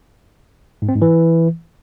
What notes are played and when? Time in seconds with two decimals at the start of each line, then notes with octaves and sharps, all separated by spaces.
0.82 G#2
0.89 C4
0.95 G#2
1.02 E3